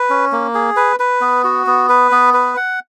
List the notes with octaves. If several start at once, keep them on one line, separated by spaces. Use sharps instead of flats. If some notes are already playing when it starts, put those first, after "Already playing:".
Already playing: B4
C#4
A#3
G#4
B4
B4
B3
F#4
B3
B4
B3
B4
F#5